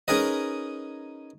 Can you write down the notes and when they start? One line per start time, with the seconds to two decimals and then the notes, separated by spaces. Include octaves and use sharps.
0.08 C#4 D#4 G#4 A#4 B4 D#5